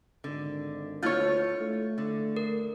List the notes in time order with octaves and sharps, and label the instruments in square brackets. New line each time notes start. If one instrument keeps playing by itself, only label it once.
[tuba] G#1 [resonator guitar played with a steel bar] D3
[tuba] D2 [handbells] A#3 E4 G6 [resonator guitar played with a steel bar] F4 C#5
[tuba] A3
[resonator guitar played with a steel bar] D3
[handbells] A#4